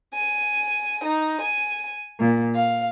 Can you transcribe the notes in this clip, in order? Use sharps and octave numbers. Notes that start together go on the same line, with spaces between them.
G#5
D#4
G#5
A#2
F5